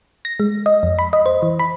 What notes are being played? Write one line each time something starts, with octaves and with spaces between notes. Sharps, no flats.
A#6
G#3
D#5
F2
B5
D#5
C5
E3
B5